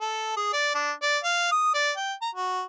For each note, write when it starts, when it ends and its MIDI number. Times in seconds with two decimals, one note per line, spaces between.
0.01 0.33 69
0.37 0.51 68
0.53 0.75 74
0.75 0.91 62
1.02 1.18 74
1.23 1.49 77
1.52 1.71 87
1.74 1.92 74
1.96 2.13 79
2.21 2.30 82
2.35 2.63 66